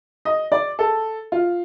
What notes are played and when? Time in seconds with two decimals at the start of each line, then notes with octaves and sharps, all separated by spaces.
0.25 D#5
0.52 D5
0.79 A4
1.32 F4